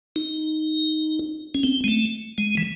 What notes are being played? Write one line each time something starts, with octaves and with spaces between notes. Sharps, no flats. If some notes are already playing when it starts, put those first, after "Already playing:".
D#4
C#4
C4
G#3
A3
G#3
E3